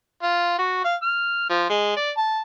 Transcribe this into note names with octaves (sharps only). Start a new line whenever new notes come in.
F4
F#4
F5
F6
F3
G#3
D5
A5